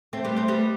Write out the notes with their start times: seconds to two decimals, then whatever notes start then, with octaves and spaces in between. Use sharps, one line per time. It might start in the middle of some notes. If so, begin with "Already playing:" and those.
0.13 A3 C4
0.25 G3 B3
0.36 A3 C4
0.48 G3 B3